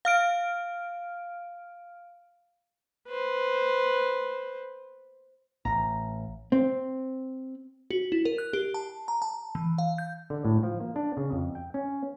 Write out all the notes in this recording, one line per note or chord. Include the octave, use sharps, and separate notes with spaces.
F5 F6 D7
B4 C5
A1 A#5
C4
F#4
E4
A#4
F#6
G4
A5
A#5
A5
E3
F5
G6
D3
A2
F3
A#3
D4
C#3
F2
G5
C#4